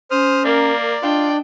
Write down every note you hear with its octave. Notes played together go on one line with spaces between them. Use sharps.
C#4 C5 D#6 F6
A#3 A#4 D5
D4 F4 D#5 G5